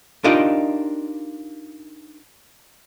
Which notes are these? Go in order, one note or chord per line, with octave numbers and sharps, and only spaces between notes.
D4 D#4 F4 G4 A#4 D#5